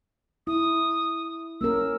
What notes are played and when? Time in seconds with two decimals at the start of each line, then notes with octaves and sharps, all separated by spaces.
0.47 E4 D#6
1.61 A#3 C#4 A#4 E6